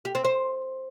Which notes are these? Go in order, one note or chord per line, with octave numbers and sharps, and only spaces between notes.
G4
C4
C5